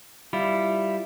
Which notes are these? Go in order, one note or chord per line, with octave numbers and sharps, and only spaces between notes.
G3 E4 F4